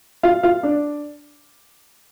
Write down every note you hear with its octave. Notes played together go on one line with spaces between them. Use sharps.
F4 F5
F4 F5
D4 D5